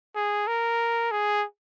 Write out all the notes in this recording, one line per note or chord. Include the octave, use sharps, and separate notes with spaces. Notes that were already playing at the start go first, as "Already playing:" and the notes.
G#4
A#4
G#4